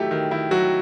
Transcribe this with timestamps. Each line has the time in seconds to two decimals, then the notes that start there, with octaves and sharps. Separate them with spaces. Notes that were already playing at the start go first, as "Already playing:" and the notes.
Already playing: D#3 F#3 A3 E4 G4
0.11 D#3
0.31 D#3 E4
0.51 F#3 F#4